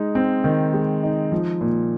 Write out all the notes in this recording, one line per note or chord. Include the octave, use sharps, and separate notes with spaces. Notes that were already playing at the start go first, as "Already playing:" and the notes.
Already playing: G#3 D#4
C4
D#3
G#3
D#4
F3
A#2